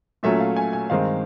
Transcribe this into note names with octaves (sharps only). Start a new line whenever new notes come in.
A#2 F#3 A3 C#4 E5
F5
G#5
G#5
G2 D#3 G#3 C4 F5